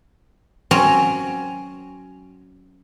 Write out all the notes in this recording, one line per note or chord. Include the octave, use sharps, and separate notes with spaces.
F#3 C4 C#4